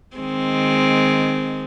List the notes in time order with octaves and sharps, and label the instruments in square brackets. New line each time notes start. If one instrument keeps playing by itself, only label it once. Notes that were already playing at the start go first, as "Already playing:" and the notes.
[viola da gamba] D#3 G#3 C4